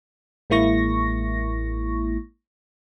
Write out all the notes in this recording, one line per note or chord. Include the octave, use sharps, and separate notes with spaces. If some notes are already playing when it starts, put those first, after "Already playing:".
A1 G#3 A#3 E4 C#6 A#6